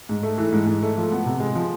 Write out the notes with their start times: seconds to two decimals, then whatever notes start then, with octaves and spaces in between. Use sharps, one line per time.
0.09 G#2
0.23 A3
0.38 E3
0.52 G#2
0.67 G#2
0.82 A3
0.97 F3
1.12 B3
1.26 C3
1.40 G#3
1.55 F3